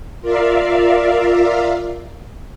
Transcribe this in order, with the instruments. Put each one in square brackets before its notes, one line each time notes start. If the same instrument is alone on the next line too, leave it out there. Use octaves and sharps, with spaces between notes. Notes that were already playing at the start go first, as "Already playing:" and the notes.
[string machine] F4 A#4 D5 E5 F5